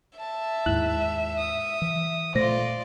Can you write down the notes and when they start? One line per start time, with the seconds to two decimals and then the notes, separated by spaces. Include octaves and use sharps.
0.19 E5 A5
0.66 D#2 G#2 E4 F#6 F#7
1.38 D#6
1.82 E3
2.35 A#2 A3 F4 C5 D5 A#6